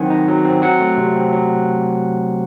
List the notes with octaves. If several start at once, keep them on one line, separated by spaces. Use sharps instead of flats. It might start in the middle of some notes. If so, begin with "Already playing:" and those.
Already playing: D#3 F#3 C4 F#5 G#5
D#4
F#3
C4
F#3 F#5
A3
C3
C4
F#3